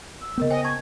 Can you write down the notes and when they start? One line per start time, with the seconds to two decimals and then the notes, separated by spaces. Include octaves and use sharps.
0.21 E6
0.38 C#3 B3 C#4 A#4 D#5
0.50 C5 D#5 G5 G#5
0.64 A5 C#6 G#6